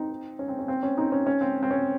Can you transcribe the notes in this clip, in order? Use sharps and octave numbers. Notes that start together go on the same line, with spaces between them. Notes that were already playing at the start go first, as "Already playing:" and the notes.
Already playing: C4 D#4
C#4
C4
C#4
C4
C#4
C4 D#4
C#4
C#4
C4
C4
C#4